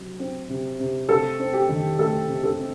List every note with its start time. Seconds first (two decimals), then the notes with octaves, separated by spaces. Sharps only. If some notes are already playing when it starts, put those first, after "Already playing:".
Already playing: C3 F#3
0.20 C4
0.49 C3
0.79 C3
1.09 C3 A4
1.39 C4
1.53 G4
1.69 D#3
1.99 A3 A4
2.28 C3
2.44 A4
2.59 C4